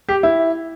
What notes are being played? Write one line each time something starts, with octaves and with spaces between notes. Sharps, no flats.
G4
E4